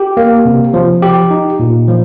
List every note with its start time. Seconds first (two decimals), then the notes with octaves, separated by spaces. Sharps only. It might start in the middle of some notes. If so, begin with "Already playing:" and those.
Already playing: G4
0.17 A#3
0.46 C3
0.74 F3
1.02 G4
1.31 D#4
1.60 A#2
1.88 F3